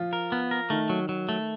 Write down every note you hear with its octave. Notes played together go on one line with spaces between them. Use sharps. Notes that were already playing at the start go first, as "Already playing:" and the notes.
Already playing: F3 F4
A#4
B3
A#4
D#3 A3 D#4
F#3
F#3
A3